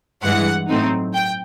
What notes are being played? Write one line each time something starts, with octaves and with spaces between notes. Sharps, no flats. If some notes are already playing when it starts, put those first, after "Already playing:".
G2 E3 G#3 F#5
A2 F#3 A3 C4 D#4
G5